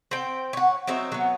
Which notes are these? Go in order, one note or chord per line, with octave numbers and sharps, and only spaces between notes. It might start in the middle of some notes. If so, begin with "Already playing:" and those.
C4 G5
C#5 F#5
F#3 C4 D#4 E5
F#3 B3